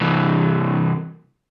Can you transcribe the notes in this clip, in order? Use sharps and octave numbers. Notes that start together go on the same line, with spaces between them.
C2 E3